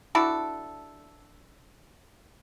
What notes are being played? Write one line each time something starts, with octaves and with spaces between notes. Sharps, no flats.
D4 E4 F#4 A4